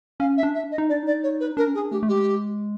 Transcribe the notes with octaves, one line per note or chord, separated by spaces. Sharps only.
C#4 F5
E5
D4
E5
D#5
D#4
D4 D5
D#4 D5
C#5
B4
D4 A#4
C#4
D4 G#4
A3 G4
A3
G#3 G4